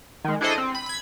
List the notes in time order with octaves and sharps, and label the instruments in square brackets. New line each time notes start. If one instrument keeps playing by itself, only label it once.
[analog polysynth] D#3 G#3
D4 E4 G#4 A4 C5 D#5
C4
B5
B5 G#6